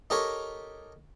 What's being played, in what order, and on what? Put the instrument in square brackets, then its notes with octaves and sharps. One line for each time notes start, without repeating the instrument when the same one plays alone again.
[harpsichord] D#4 G4 A4 A#4 C#5